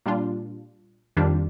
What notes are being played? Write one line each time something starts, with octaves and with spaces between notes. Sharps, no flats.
A#2 G3 D4 F4
F2 D#3 G3 D4 F4